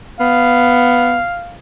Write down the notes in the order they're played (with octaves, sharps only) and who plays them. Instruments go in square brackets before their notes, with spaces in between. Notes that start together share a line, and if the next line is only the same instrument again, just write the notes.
[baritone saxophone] B3 [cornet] F5